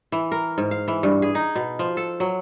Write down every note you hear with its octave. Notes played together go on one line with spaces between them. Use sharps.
E3
A#4
G#2
F5
E3
G2
G#4
D#4
B2
F3
A4
F#3